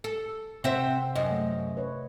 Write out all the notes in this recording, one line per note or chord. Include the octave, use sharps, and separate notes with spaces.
A4
C3 C4 C5 E5 F#5
F#2 D#5
A3
B4 C#5